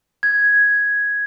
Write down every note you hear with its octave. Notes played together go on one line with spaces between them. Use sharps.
G#6